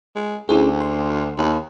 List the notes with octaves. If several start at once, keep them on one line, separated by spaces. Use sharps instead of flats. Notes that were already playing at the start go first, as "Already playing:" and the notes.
G#3
D2 C#4 E4 G#4
C6
D#2